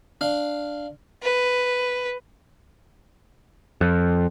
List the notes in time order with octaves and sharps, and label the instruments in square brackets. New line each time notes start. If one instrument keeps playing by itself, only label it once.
[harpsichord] D4 F5
[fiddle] B4
[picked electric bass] F2